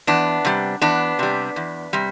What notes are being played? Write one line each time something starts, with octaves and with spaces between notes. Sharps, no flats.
E2 B3 D4
C3 G3
E2 B3 D4
C3 G3
E2
C3 G3